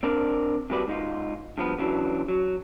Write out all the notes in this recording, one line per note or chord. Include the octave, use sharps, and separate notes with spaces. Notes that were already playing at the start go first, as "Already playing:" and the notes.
C4 D4 A#4 D5
C3 G3 F#4 B4 D5
G#2 D#4 F4
G2 F3 B3
C#3 E3 F#3 D4
F#3